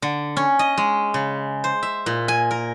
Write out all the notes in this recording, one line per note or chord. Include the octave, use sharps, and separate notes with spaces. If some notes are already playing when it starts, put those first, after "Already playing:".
D3
C#4
D#5
G#3
C#3
C5
E5
A#2
G#5
A#4